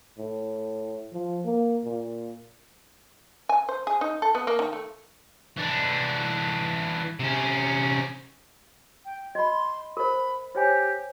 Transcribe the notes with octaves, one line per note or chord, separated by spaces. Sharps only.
A2
F3
A#3
A#2
G#5
C5
G#4
D#4
A4
B3
A#3
D#3
A3
E3 D4
C3 C#4
G5
D#5 B5 C6
A#4 C5 B5
G4 C5 C#5 G#5